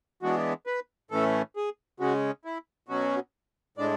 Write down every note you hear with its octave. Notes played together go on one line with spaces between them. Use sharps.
E3 G#3 B3 D4 F#4
B4
A2 E3 A3 C#4 A4
G#4
C#3 G#3 C#4 F#4
E4
B2 F#3 C#4 F#4
A2 G#3 D4 D5